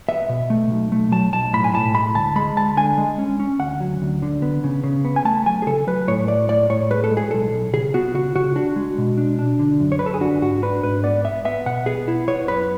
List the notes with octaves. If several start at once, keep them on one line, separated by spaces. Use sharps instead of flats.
B3 E5
B2
A3
B1
A3
F#3 A5
B1 A5
A2 B5
G#5
A2 A5
G#3 B5
D2 A5
G#3 B5
D2 A5
D3 G#5
G#3
C#4
C#4
D2 F#5
F#3
D2
D3
B3
C#3
C#3
B3
G#5
A3 A5
F#3 G#5
G#4
C#3 A4
F#3 B4
A2 C#5
A3 D5
A2 D5
A2 C#5
G#3 B4
A4
G#3
G#4
B1 A4
B1
C#3 G#4
B3 F#4
C#3 F#4
C#3 F#4
D4 F#4
G#3
B2
D4
D4
D3
F#2
C#5
D3 B4
A4
G#4
D4 F#4
G#2 F#4
D4 B4
G#2 B4
B3 D5
B3 E5
B3 E5
B2 F#5
B3 G#4
E4
B3 C#5
F#2 B4